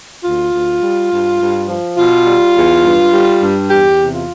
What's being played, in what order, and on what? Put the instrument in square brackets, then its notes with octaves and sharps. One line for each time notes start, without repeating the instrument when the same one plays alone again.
[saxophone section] D2 F4
D2
G3
G2
G2
F3
B2 F4
G3
E2
G2
G3
G2
E2 G4
C3
F4